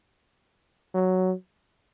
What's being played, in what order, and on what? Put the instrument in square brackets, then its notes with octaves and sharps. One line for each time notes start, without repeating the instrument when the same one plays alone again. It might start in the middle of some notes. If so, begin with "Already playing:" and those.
[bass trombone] F#3